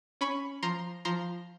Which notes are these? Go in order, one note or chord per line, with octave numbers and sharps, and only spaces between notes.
C#4 B5 C#6
F3 A#5 C6
F3 A#5 C6